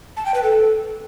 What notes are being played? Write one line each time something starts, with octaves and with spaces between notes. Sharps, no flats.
A5
G5
B4
A4